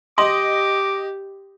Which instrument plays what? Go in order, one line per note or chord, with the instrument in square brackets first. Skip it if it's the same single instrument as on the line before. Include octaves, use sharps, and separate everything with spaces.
[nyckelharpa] G4 [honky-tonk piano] D#5 [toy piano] C6 [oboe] D6